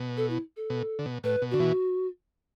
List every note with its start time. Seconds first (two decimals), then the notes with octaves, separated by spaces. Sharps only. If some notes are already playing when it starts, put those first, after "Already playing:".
Already playing: B2
0.17 A4
0.30 E4
0.57 A4
0.70 B2
0.99 D3
1.06 B2
1.24 A2 B4
1.42 B2
1.51 D3 F#4
1.60 B2 E3